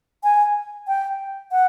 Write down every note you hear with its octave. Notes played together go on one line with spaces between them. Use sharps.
G#5
G5
F#5